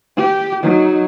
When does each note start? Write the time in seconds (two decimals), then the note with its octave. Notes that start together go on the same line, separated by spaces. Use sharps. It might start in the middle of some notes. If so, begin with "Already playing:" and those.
0.17 G4
0.62 F#3 D#4